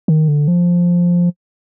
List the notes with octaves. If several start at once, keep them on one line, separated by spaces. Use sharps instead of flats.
D#3
D3
F3